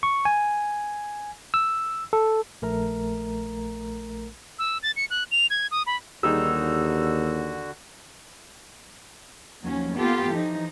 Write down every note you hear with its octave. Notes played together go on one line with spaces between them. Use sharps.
C#6
G#5
E6
A4
A#1 A3 A#4 A#5
E6
A6
C#7
F#6
F7
G#6
D#6
B5
D#2 D3 G3 D#4 F#4 G#4 E6
D#2 F3 F#3 C#4
A#3 B3 F4 G4 A4
E3 F3 D#4